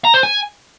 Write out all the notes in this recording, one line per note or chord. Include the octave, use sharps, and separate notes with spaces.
A#5
C5
G#5